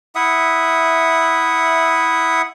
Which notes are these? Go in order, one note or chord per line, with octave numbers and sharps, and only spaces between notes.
E4 E5 F#5 D#6